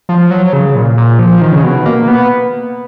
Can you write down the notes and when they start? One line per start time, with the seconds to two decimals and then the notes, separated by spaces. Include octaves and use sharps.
0.09 F3
0.31 F#3
0.53 C#3
0.75 A#2
0.97 A#2
1.19 F3
1.41 D#3
1.52 C#3
1.63 B2
1.86 A#3
2.08 B3